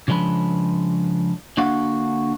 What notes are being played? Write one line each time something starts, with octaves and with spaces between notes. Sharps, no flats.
C#3 F3 G#3 D4 B4
D3 A#3 D4 F#4 F5 F#5